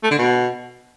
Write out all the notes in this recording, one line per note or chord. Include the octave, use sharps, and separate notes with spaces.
A3
D3
B2